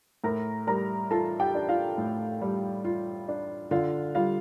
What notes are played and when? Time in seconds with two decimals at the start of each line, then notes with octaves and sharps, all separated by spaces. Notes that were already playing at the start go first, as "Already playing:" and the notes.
0.24 A2 A#4 A#5
0.67 G3 A#4 A#5
1.11 F4 A4 A5
1.40 G4 G5
1.55 D4
1.69 F4 F5
1.98 A2
2.41 G3
2.85 F4
3.28 D4
3.71 D3 F4 F5
4.15 G3 F4 F5